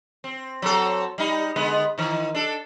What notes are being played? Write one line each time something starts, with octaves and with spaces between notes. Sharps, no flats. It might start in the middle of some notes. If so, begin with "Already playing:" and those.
C4
F#3 C4 A4
G3 D#4
D3 G#3 B3
D#3 E3
D4 A4